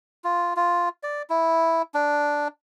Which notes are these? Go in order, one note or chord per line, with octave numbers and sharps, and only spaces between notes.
F4
F4
D5
E4
D4